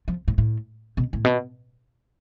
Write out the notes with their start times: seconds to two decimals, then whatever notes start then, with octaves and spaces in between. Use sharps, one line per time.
0.08 F3
0.28 A2
0.38 A2
0.97 B2
1.13 A2
1.25 B2